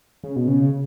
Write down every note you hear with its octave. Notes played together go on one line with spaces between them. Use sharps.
C#3
B2
C#3